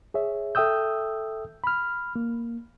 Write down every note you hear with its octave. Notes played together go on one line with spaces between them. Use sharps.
G#4 C#5 E5
A4 E5 G5 D#6 E6 G6
B5 F6
A#3